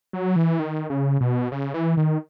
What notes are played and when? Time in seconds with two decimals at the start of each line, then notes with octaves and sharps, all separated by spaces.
0.13 F#3
0.36 E3
0.59 D#3
0.90 C#3
1.21 B2
1.52 C#3
1.74 E3
1.97 D#3